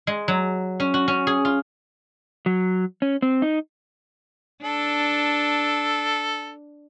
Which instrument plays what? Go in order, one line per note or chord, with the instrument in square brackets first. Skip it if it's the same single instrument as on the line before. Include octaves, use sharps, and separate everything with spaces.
[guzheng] G#3
F#3
C#4
F#4
C#4
G#4
F4
[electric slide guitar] F#3
C#4
C4
D#4
[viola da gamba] D4 [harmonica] A4